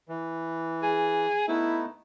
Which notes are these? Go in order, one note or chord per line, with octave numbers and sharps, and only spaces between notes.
E3
G#4
A3 B3 D#4 E4